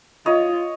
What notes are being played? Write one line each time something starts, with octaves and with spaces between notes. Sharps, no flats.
F4 C#5 D#5